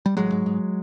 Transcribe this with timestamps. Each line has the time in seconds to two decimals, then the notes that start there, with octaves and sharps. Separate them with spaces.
0.06 G3
0.17 A1 F#3 G#3
0.32 G#2
0.46 G#2